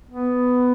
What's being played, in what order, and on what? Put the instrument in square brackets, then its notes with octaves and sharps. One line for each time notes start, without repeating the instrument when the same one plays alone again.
[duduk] B3